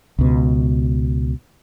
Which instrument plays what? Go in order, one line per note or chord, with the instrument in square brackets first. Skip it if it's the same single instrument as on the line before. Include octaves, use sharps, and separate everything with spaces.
[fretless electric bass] C#2 B2